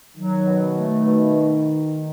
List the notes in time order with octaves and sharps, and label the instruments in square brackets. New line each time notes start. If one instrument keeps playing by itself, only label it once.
[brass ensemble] D#3 D#4 [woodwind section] F#3
[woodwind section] B2
A3
B2